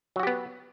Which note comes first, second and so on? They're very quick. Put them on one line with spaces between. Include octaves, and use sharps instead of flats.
F#3 F#4 G4 B3